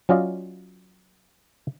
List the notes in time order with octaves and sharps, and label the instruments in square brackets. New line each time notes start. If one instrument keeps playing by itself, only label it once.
[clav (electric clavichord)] F#3 C#4 F4 D5 D#5 F5